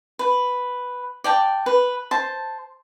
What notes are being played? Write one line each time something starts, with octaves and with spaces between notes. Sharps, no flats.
B4
D5 G5 A5
B4
C5 A5